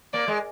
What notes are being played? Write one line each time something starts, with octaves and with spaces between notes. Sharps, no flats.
A#3 D5
G#3